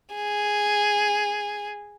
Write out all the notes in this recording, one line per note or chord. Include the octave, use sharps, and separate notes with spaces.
G#4